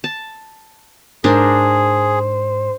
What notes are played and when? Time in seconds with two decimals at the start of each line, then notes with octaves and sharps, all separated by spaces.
0.04 A5
1.24 G#2 D4 G#4 A#4 C5